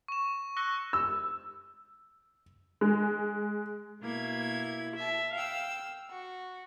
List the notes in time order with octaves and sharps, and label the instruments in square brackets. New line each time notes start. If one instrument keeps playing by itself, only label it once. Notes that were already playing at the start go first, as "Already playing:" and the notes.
[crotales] C#6 E7
C#6 E6 F#6 A#6 C#7 G7
[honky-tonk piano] E6
G#3
[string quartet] B2 A#3 E4 G#6
E5 A5
F5 G5 E6
F#4